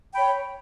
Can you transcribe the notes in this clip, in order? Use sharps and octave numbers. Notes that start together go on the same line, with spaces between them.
C#5 G5 B5